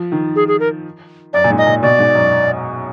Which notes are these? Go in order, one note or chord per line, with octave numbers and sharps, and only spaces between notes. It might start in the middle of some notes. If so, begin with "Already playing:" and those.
Already playing: F3
D#3
G#4
G#4
A#4
F#2 D5
A#2
G#2
D#5
A#2
B2 D5
G#2
F#2